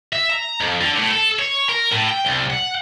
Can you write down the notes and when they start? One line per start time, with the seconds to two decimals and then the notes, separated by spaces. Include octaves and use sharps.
0.13 E5
0.30 A#5
0.61 F2
0.81 D3
0.96 A2
1.11 A4
1.39 C#5
1.69 A#4
1.92 A2
2.08 G5
2.25 C2
2.50 F#5